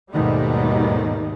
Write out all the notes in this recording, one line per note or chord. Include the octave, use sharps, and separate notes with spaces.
D#2 G#2 B2 D#3 G3 A3